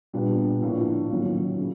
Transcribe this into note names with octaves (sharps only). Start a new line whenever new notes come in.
A#2 G3 B3 D4 F4
A2 F3 A#3 D4 F4
D#3 F#3 A#3 C#4 F4
C#3